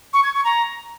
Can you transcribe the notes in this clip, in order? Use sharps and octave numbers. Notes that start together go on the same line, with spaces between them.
C#6
G#6
C#6
A#5